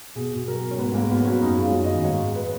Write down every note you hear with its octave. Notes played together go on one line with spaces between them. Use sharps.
B2 G#4
B2
F#3 A#4
F#3
C#4
G#2 B3
G#2 A#3
F#3 B3
F#3 C#4
F#2 D#4
G#3 F4
F#2
D#5
D#3
G#2 C#5
G#3
B4